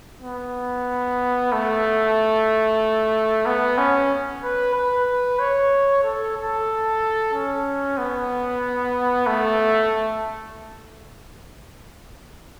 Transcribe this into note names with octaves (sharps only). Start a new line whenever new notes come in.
B3
A3
B3
C#4
B4
B4
C#5
A4
A4
C#4
B3
A3